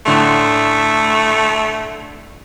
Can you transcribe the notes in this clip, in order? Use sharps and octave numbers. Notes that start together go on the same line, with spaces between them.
A2 D3 A3 C6